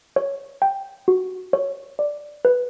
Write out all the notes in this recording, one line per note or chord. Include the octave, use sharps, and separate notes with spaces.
C#5
G5
F#4
C#5
D5
B4